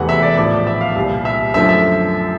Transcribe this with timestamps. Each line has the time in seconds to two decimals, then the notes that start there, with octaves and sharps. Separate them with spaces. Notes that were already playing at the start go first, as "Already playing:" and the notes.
Already playing: E1 E2 C3 E3 A3 F#5
0.09 E5
0.23 D5
0.37 A#1 A2 F3 D5
0.67 E5
0.81 F5
0.95 C2 A#2 G3
1.25 E5
1.54 F#2 D3 F3 A3 E5
1.69 E5